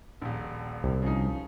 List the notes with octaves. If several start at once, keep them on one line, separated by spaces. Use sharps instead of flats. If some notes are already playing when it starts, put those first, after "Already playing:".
D#1 A#1
C2
C#3 F3 D#4